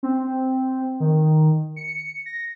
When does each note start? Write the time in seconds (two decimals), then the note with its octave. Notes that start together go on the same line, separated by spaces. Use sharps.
0.03 C4
1.00 D#3
1.76 C#7
2.26 A#6